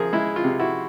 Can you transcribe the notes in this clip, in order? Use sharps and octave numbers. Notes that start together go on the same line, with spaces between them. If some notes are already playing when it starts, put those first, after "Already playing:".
Already playing: F3 G#4 A#4
G#3 E4
F4
C3
E4 F#4